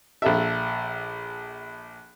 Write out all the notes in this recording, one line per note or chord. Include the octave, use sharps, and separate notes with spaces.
A#1 A4 E5